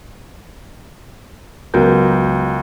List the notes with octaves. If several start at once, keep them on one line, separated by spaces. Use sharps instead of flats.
C#2 F#3 B3 A#4 G6